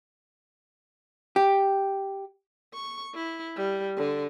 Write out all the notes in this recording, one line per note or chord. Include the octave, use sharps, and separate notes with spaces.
G4
C#6
E4
G3
D3